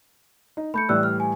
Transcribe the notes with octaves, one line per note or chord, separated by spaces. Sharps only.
D#4
A3 B5 G6 C#7
A2 E3 G3 D5 E6 F#6
F6
G#5